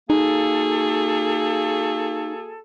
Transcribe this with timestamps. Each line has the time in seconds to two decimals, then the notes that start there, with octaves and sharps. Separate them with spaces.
0.10 A#3 D#4 F#4 G#4 A4